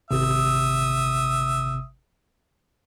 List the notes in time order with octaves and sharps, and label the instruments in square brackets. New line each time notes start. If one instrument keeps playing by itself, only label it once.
[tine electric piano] G#1 C3 [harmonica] E5 D#6